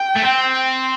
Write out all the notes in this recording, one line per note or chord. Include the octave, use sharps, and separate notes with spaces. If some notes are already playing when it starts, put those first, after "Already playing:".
Already playing: G5
A3
C4